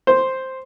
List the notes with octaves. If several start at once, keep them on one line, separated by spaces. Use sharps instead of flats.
C5